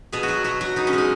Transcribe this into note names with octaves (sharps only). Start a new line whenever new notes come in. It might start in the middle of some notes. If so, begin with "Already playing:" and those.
B2 G#4
F#4
F#3
B2 F#4
F#3 F#4
B2 D#4
C#4
G#3 D#4